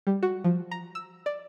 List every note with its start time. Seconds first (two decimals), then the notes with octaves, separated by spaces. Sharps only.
0.07 G3
0.23 F#4
0.44 F3
0.71 A#5
0.95 E6
1.26 D5